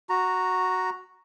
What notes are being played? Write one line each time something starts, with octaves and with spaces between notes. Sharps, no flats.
F#4 A#5